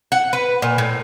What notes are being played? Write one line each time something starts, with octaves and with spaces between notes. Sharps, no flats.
F#5
B4
A#2
A2